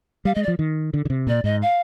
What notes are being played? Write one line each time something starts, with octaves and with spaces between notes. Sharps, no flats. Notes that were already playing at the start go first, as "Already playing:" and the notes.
G3 F5
G#3 D#5
D5
F3
D#3
D3
D3
C3
A#2 D5
G#2 D#5
F5